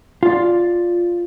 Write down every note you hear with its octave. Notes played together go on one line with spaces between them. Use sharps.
F4 D5